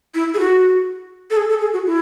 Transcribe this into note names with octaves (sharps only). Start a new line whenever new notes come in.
E4
G#4
F#4
A4
G#4
A4
G#4
F#4
E4